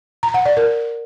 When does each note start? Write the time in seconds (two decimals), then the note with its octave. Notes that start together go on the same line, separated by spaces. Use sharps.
0.23 A#5
0.34 F#5
0.46 D5
0.57 A#4